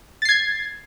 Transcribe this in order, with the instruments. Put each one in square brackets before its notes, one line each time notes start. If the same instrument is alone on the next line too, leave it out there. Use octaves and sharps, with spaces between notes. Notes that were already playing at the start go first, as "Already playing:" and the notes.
[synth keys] A6
C7
G#6